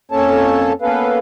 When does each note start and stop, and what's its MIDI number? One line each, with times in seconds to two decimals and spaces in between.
0.12 0.73 41
0.12 0.73 58
0.12 0.73 61
0.12 0.73 69
0.12 0.73 73
0.12 0.73 81
0.82 1.18 58
0.82 1.18 59
0.82 1.18 61
0.82 1.18 69
0.82 1.18 71
0.82 1.18 77